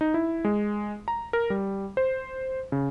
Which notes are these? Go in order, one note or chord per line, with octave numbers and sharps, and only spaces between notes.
D#4
E4
G#3
A#5
A#4
G3
C5
C#3